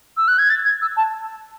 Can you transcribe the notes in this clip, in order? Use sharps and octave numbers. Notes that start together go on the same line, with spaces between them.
E6
F#6
G#6
A6
G#6
E6
A5